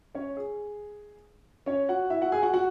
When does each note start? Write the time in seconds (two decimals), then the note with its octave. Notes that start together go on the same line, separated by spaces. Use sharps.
0.15 C#4 C#5
0.36 G#4
1.66 C#4 C#5
1.89 F#4 F#5
2.10 E4 E5
2.21 F#4 F#5
2.32 G#4 G#5
2.43 F#4 F#5
2.54 F#4 F#5